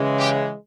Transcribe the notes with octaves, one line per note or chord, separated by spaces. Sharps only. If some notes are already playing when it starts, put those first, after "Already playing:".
Already playing: C#3 E3 G#3
G4